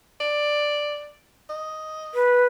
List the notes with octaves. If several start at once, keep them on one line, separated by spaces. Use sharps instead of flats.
D5
D#5
B4